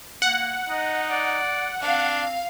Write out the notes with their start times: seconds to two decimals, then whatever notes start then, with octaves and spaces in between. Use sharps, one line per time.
0.22 A#3 F#5
0.69 D#4 D#5
1.09 D5
1.82 C4 D4 F5